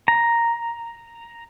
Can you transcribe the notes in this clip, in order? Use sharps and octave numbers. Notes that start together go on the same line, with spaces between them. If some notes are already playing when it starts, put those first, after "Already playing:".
A#5